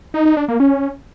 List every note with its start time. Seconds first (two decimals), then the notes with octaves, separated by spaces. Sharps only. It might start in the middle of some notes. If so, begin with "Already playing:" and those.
0.14 D#4
0.25 D#4
0.37 D4
0.48 A#3
0.60 C#4